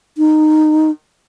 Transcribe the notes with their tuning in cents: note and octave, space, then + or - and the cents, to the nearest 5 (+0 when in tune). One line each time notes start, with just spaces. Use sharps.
D#4 -15